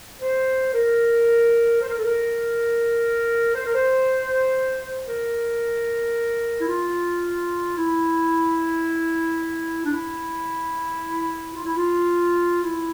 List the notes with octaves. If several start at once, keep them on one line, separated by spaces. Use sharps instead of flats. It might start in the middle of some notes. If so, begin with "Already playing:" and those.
C5
A#4
C5
A#4
A4
A#4
C5
A#4
C5
A#4
E4
F4
E4
D4
E4
F4
E4
F4
E4